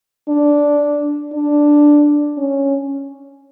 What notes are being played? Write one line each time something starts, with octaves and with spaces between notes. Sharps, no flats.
D4
D4
C#4